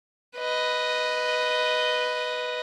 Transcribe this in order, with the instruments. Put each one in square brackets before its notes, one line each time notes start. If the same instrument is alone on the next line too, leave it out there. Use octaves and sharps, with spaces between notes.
[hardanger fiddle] B4 D#5